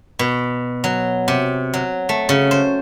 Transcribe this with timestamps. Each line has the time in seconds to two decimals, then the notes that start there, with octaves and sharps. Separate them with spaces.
0.19 B2
0.84 F#3
1.28 C3
1.74 F#3
2.09 A3
2.29 C#3
2.51 C5